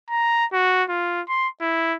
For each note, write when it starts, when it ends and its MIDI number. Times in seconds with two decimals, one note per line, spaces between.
0.10 0.45 82
0.53 0.84 66
0.89 1.22 65
1.29 1.48 84
1.61 1.96 64